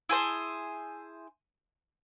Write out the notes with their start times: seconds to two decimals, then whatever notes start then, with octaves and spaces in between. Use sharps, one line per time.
0.09 E4 G#4 C5 A5